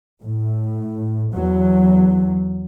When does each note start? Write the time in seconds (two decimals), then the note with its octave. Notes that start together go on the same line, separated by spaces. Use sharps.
0.22 A2
1.35 E2 F#3